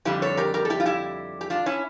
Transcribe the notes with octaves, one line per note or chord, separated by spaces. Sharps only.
F2 D3 G3 E4 G4
A4 C#5
G4 A#4
G4 A#4
A4
E4 G4
F4
E4 G4
G4
D4 F4
C#4 E4